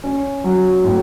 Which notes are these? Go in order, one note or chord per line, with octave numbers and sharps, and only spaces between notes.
C#4
F#3
A2